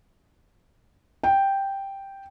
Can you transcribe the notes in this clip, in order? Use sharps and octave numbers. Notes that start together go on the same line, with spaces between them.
G5